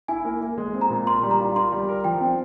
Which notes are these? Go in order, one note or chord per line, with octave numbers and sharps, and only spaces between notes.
E4 G#5
A#3
A#3
G#3
C4
A#5
A#2
A#4 C6
G3
A#5
F4
A#4 C6
G3
A#4
F3 G5
C4